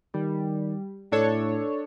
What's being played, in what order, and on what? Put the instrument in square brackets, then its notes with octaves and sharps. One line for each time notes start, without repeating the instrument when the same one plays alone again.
[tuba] D#3 [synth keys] G3
[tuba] A2 [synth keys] D4 A4 C#5